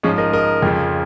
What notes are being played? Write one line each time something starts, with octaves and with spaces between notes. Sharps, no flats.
G#2 F3 G#3 C#4
A#4 D#5
A#4 D#5
F2 C#3 F3